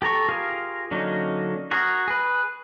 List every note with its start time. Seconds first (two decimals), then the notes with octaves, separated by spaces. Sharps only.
0.02 G4 A4 A#5 C#6
0.29 F4 G4 G#4 A#4 F5
0.91 D3 F#3 A#3 C#4 D#4
1.71 F#4 G#4 A#4
2.08 G#4 B4